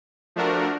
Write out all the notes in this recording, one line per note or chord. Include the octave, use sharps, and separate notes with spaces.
F3 A3 D4 F#4 A#4